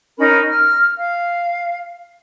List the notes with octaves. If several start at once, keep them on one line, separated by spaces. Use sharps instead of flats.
C#4 D#4 A#4 B5
F6
F5